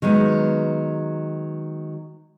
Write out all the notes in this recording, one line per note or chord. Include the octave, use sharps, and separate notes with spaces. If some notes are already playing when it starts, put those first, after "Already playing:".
D#3 F#3 G#3 B3